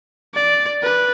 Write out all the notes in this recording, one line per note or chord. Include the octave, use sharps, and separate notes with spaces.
D5
B4